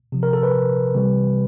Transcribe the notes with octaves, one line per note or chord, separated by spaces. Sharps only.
C3 F3
A#4
A4
B4
C3 E3 G3